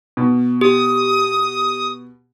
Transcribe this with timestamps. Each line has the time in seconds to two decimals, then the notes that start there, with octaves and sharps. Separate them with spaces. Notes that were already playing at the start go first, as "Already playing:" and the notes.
0.17 B2
0.61 G4 D#6